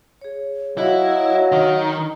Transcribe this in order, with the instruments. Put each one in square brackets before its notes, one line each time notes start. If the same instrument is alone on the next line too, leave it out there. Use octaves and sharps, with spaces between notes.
[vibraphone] G#4 C#5
[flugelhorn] F#3 [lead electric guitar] E4 [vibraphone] F#4 C#5 F5 [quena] D#5
[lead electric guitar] D#3